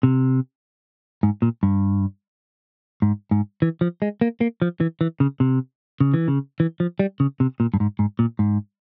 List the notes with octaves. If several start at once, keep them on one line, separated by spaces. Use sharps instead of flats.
C3
G#2
A#2
G2
G#2
G#2
E3
F3
G#3
A#3
A#3
F3
E3
E3
C#3
C3
C#3
E3
C#3
E3
F3
G3
C#3
C3
A#2
G2
G#2
G#2
A#2
G#2